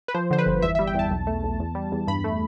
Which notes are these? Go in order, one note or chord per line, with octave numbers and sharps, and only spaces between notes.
B4
F3 C5
D3 C5
B4
G1
E2 E5
G3 E5
G5
E2 A5
B1
A3
B1
E2
G3
E2
G2 B5
A3